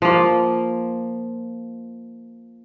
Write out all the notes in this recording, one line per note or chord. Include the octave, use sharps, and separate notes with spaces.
F3 A#3